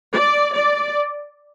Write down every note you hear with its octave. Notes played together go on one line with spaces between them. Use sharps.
D5
D5